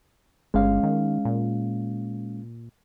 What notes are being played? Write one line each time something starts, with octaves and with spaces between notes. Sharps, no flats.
G1 G#3 C#4 F5
D#3
A#2